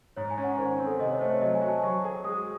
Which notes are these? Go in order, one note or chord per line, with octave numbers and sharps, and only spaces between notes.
G#2 C#5
G#5
C#4
F#5
D#3 C5
C4
A4
C3 D#5
C#5
A3 C5
C#5
F#3 D#5
G#5
F#4
A5
F#3 C#6
G#4
G#3 D#6